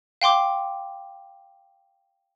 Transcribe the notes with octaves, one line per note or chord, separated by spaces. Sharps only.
F5 G5 C6 D6